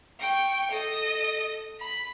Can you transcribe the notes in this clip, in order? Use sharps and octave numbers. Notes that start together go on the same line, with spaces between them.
G5 C#6
A4 D#5
B5